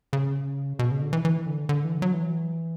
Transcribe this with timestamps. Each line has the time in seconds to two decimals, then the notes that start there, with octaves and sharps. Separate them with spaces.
0.13 C#3
0.79 B2
0.91 C#3
1.01 D3
1.13 E3
1.25 E3
1.46 D3
1.69 D3
1.84 E3
2.02 F#3
2.13 E3